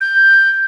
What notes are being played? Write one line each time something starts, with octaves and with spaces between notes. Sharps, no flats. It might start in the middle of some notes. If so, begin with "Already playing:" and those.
G6